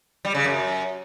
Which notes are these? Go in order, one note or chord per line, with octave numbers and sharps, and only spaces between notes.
G3
C#3
F#2